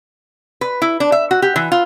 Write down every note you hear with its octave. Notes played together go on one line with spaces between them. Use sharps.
B4
E4
D4
E5
F#4
G4
E3
F4